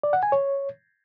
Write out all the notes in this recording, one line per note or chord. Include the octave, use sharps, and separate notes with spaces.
D5
F#5
G#5
C#5